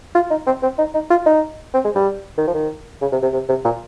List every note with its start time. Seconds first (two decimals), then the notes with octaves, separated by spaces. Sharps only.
0.15 F4
0.30 D#4
0.47 C4
0.63 C4
0.78 D#4
0.94 D#4
1.10 F4
1.26 D#4
1.74 C4
1.85 G#3
1.95 G3
2.38 D#3
2.47 F3
2.54 D#3
3.01 C#3
3.12 C3
3.23 C3
3.33 C3
3.49 C3
3.65 A#2